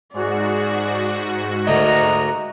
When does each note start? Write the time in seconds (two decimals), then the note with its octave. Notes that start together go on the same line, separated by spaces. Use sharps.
0.13 G#2 F#4 G#4 D5
1.67 D2 A#4 D#5 A#5